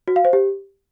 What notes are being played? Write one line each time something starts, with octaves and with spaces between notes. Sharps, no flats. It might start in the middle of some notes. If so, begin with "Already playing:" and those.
F#4
F5
C5
G4